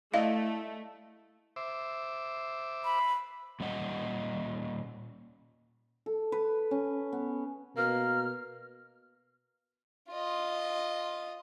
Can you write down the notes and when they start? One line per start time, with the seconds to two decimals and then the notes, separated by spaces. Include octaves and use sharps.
0.14 A3 E4 D5 D#5 F5
1.56 C5 E5 D6
2.84 B5
3.60 A#2 G3 C#4 D#5 F#5
6.06 A4
6.32 B4
6.71 C#4
7.12 B3
7.77 B2 A#3 F6
10.11 F4 D#5